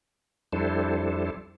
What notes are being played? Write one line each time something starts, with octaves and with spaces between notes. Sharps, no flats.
F2 G3 D4 E4 A4 C5